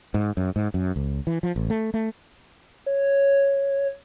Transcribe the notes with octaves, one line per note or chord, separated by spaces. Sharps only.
G#2
F#2
G#2
F#2
C#2
E3
F3
A1
A3
A3
C#5